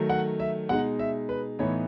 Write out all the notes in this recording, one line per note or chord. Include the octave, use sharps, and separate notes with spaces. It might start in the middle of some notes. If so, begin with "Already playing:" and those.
Already playing: D#3 F#3 A3
F#5
E5
B2 G#3 D#4 F#5
E5
B4
A2 E3 B3 D#4 C#5